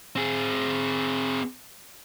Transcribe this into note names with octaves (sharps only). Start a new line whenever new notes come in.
C4 G#4